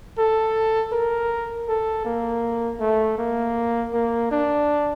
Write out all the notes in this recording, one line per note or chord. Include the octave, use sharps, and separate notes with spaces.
A4
A#4
A4
A#3
A3
A#3
A#3
D4